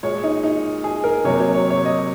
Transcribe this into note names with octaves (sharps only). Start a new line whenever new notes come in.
A#2 G#3 C#5
D#4
D#4
G#4
A#4
C3 F#3 A#3 C#5
C#5
C#5
C#5
D#5